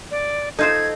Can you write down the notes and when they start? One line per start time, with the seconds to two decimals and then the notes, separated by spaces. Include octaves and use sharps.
0.11 D5
0.59 D#4 F4 A4 C5 D#5 G#6